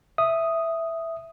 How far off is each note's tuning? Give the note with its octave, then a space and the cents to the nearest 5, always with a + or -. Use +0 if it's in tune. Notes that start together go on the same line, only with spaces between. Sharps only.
E5 +0 D#6 +0